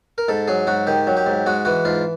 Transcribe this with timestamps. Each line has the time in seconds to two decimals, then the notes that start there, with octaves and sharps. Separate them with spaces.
0.18 A#4
0.28 G#2 A4
0.48 F#3 G#4
0.67 G#2 F#4
0.87 D#3 G4
1.07 F#3
1.17 G4
1.26 G#2
1.46 G#3 F#4
1.65 E3 F#4
1.85 G#2 F4